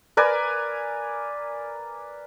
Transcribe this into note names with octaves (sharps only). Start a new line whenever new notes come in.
A#4 B4 D5 G#5